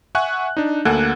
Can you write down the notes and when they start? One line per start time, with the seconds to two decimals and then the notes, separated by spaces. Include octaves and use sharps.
0.15 E5 F#5 G#5 C#6 F#6
0.57 D4 D#4
0.85 D2 A#3 A4 F#5 F#6 G#6